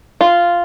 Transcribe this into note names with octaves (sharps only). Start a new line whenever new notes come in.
F4